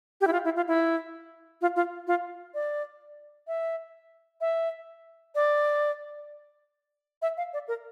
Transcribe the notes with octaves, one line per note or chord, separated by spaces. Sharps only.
G4
E4
F4
E4
F4
E4
F4
F4
F4
D5
E5
E5
D5
E5
F5
D5
A#4